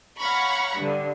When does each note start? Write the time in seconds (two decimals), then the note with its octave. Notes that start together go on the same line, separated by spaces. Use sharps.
0.18 C#5 F5 F#5 A#5 B5 C#6
0.77 G2 D3